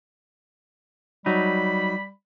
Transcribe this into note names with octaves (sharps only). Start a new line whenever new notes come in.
F#3 G3 D#4 B5